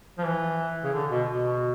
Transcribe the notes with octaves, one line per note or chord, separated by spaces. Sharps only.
F3
E3
C#3
D3
B2
B2